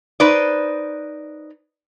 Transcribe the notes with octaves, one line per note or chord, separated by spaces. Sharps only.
D#4 B4 C5 D5